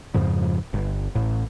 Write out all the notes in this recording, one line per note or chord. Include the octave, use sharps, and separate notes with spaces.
F2 G#2 C#3 F3
G1
A1 A2